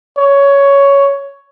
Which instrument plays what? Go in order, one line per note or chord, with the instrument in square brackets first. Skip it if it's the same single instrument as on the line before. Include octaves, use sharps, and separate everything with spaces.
[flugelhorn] C#5